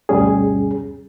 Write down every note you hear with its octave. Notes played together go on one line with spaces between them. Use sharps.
D2 G2 B2 G3 C#4 G#4